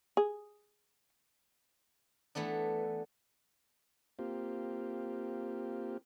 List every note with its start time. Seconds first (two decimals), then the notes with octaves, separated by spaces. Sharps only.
0.17 G#4
2.35 E3 A3 B3 D4
4.19 A#3 C4 F4 G4